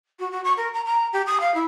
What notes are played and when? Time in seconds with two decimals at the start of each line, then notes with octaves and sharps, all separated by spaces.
0.19 F#4
0.31 F#4
0.44 C#6
0.57 A#4
0.74 A#5
0.85 A#5
1.12 G4
1.26 D#6
1.40 F5
1.54 E4